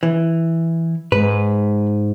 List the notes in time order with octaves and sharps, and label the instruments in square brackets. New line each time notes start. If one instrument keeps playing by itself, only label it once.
[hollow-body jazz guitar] E3
[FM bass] G#2 [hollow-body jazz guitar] B4